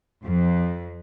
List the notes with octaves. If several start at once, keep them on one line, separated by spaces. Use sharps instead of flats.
F2